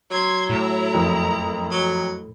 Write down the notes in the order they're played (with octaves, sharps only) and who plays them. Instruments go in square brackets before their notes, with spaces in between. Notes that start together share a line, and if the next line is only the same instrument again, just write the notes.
[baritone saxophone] F#3 [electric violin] C6 G#6
[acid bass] A2 [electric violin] E4 A#5
[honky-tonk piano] F#1 F2 A#4
[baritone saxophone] F#3